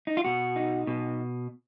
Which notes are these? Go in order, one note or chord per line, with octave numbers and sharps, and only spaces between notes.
D#4
F4
B2 F#4
D#4
B2